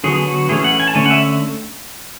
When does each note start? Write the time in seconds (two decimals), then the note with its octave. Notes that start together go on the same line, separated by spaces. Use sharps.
0.04 D3 F#3 B3 G#4
0.27 F#4
0.49 E3 A3 C#4 G#4
0.64 F#5
0.80 G#5
0.88 A5
0.95 D3 A3 C#4 G#5
1.06 F#5
1.11 E5